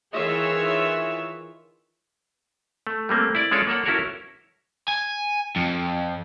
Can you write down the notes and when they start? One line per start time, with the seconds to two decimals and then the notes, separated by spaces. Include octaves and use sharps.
0.13 D#3 E3 F4 G#4 C#5 E5
2.87 A3
3.09 G3 A3 A#3 C4
3.35 E4 D5
3.51 G#3 C#4 F4 A4 C#5 D5
3.68 A#3 A4 C#5 F#5
3.85 C#4 E4 F#4 A4 A#4 C#5
4.88 G#5
5.56 F2